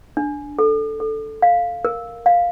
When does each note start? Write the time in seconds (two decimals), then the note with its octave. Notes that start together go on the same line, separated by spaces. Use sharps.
0.17 D4
0.59 A4
1.00 A4
1.42 F5
1.85 A#4
2.26 F5